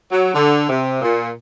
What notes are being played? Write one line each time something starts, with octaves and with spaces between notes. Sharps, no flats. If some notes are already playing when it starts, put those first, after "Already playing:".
F#3
D3
C3
A#2